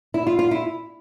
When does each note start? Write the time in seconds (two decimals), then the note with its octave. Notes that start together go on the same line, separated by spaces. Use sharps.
0.14 E4
0.27 F4
0.39 F4
0.51 E4